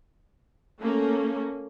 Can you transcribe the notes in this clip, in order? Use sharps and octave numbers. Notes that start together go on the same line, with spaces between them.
A3 A#3 C#4